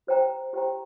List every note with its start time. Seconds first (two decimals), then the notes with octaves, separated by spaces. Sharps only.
0.07 G4 C5 G5 A#5
0.53 G4 C5 G5 A#5